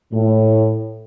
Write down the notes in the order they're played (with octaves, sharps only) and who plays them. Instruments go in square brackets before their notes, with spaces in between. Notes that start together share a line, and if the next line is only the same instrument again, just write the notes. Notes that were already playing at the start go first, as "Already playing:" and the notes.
[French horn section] A2